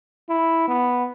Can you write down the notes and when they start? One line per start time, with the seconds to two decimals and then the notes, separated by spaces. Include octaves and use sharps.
0.29 E4
0.68 B3